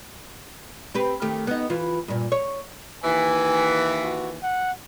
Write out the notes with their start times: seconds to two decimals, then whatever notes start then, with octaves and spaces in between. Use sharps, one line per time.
0.94 C4 G4 B4
1.22 D#3 A3 G4
1.47 B3 D#4
1.70 E3 F4
2.08 G2 A#2
2.32 C#5
3.03 D#2 E3 G#5
4.03 F#4
4.43 F#5